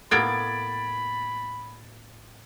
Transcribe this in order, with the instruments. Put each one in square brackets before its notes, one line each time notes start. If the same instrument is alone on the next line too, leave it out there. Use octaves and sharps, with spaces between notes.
[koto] A2 A#3 B3 [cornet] B5 [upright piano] G#6 A6 D7